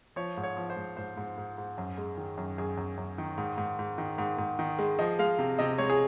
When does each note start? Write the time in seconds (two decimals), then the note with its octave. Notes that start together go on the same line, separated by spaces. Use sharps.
0.16 F3 C#5
0.37 G#2
0.43 C#5
0.57 F3
0.70 C5
0.76 G#2
0.97 G#2 C5
1.17 G#2
1.38 G#2
1.58 G#2
1.78 F#2
1.98 G#3
2.17 D#3
2.37 F#2
2.58 F#2 G#4
2.77 F#2
2.98 F#2
3.18 D#3
3.38 G#2
3.58 G#2
3.79 G#2
3.98 D#3
4.18 G#2
4.38 G#2
4.59 D#3
4.79 G#3
4.99 F3 D#5
5.19 G#3 F5
5.39 C3
5.59 C3 D#5
5.78 G#3 C#5
5.90 G#4